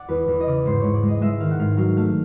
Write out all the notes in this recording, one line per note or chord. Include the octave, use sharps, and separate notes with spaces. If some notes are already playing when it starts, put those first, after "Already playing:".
Already playing: D5 F#5
E2 B4
E2
D#5
C#3 D5
G#2 C5
G#2 C#5
D5
G#3
D#5
G#3 E5
D#3 F5
F#5
G#2 F5
F#3 F5
A3 F5